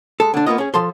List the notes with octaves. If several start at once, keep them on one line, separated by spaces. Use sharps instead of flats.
G#3 A4
D3 D4
A#3 B3 F4 D#5
C#4 G#4
F3 A4 C6